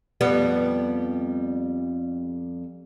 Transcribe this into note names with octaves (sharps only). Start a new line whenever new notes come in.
F2 G3 B3